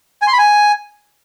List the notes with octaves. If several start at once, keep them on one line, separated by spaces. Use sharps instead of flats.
G#5
C6
B5
G#5